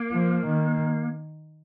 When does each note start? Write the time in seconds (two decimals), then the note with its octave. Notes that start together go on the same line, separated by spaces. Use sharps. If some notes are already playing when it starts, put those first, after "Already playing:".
Already playing: A#3
0.12 F3
0.46 D#3